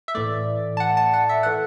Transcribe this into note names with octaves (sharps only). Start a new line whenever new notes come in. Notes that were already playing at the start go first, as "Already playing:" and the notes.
E5
A2 E3 A3 D5
A5
F#5
A5
F#5
E5
E3 A3 F#5